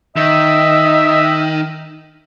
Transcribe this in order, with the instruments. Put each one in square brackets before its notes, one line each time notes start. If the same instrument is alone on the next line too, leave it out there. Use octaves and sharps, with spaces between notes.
[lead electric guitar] D#3 [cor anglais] D#5 [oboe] E5